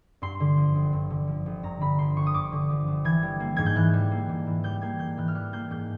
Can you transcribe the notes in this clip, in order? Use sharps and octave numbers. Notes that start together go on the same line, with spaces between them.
G2 C6
D3
F3
G1
G2
D3
F3
G1
G2 A#5
D3 B5
F3 C6
G1 C#6
D#6
G2 D6
D3
F3
G1
E3 G#6
G3
A#3
G#2 G#6
G6
E3 F#6
G3
A#3
G#2
E3
G3 G6
A#3 G#6
G#2 G6
E3 F#6
F6
G3 F#6
A#3 G6
G#2 G6